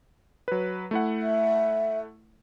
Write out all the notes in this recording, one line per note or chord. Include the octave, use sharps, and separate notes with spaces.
F#3 B4
A3 E4 F#5
E5